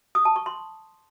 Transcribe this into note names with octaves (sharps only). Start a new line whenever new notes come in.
D#6
A5
C#6
C6